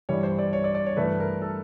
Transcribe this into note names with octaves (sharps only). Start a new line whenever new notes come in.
G2 E3 G3 C#5
C5
D5
C#5
D5
D5
C#5
G2 E3 A3 B4
A#4
A4